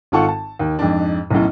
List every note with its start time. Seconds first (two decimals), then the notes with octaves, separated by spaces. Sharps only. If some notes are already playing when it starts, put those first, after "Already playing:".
0.12 G#1 D#3 F4 A4 F#5 C#6
0.28 A5
0.59 D#2
0.79 F2 G#2 D4
1.30 B1 F#2 A2